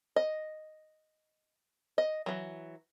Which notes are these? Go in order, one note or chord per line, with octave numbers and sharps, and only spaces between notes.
D#5
D#5
E3 F#3